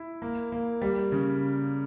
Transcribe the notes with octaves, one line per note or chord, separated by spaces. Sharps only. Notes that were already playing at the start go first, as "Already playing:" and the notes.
Already playing: E4
A#3
A#3
G3
C#3